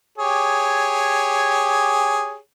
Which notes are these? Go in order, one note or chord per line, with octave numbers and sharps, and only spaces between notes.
G4 G#4 C#5